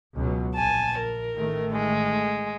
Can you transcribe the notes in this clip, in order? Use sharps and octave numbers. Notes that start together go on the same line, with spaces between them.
C#2 B2 F#3
A#1 G#5 A5
A#4
A1 D#3 A3
G#3